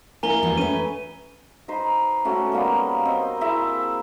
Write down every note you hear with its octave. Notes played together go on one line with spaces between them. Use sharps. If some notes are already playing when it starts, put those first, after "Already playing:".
A#3 C#4 E4 G#5 A#5 G7
E2 G3 F#4
A3 C#4 B4 D#7
D#4 B4 C5
A3 C#4 F#4
G3 A#3 B3
C4 D#5
E4 G#4 E5